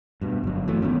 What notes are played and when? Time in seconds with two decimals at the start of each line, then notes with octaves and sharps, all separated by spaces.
0.21 G2 B2
0.44 G1 F#3
0.68 E3 A3
0.82 D#1 D#3 B3 C#4